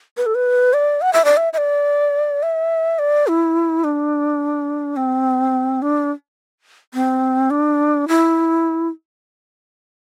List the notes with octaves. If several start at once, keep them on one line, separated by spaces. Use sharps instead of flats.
B4
A4
B4
D5
F#5
E5
D5
E5
E5
D5
E5
D5
E4
D4
C4
D4
C4
D4
E4